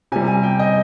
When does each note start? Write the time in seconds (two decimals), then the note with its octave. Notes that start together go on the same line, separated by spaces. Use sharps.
0.12 C3 G3 G#5
0.28 G#5
0.43 G5
0.60 D#5